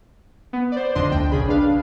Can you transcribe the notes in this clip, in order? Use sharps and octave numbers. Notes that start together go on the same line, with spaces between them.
B3
C5 D5
G#1 F2 D3 D4 D#5 C6
D2 G5
A#1 C#3 G#4 B5
D4 B4 F5